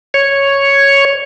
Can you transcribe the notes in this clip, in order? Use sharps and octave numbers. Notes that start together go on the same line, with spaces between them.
C#5